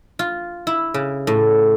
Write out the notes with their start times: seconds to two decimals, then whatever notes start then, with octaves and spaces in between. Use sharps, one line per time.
0.19 F4
0.67 E4
0.94 C#3
1.27 A2